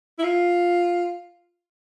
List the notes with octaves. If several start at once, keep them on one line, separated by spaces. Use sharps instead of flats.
E4
F4